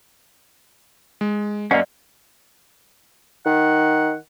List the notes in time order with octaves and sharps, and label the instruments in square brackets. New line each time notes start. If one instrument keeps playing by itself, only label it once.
[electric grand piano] G#3
[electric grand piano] F#2 [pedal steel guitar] A#3 C#4 [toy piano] D5 D#5 F#5
[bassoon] D#3 [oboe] F#5